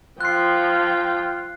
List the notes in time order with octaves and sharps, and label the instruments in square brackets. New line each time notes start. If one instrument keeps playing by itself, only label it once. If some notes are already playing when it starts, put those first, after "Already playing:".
[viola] F3 G5 [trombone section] F4 [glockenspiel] F#6 C7